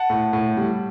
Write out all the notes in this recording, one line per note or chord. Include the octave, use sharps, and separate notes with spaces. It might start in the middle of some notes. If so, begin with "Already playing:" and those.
Already playing: F#5 A5
A2
A2
G3